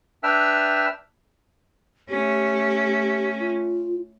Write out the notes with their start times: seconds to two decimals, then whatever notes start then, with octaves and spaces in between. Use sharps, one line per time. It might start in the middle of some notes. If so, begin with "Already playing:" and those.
0.23 D4 B4 E5 G5 E6 F6
2.10 A3 C#4 G4
3.40 F4